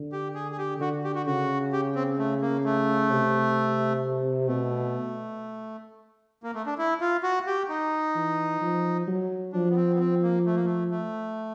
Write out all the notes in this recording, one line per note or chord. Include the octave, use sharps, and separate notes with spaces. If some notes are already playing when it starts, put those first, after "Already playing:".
Already playing: D3
G4
G#4
G#4
G4
D3 F#4
G4
F#4
C#3 F#4
G4
C4
A3
A#3
A3
C3
B2 A3
A#3
A3
D4
E4
F4
F#4
G4
D#4
E3
F3
F#3
F3 D4
B3
C4
B3
C4
A#3
A3
A#3
A3
A3